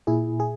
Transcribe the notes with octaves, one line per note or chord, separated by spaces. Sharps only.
A#2 E4 G#4
G#4